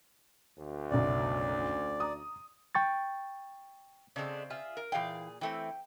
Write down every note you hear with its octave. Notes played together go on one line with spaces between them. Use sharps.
D2
F#1 B1 D5
A#5 D#6
G5 C#6 A6
C#3 G#3 A3 C4 D4
F4 G#4 E5
A#4
A#2 E3 G#4 F5 G5
E3 A3 C4 G5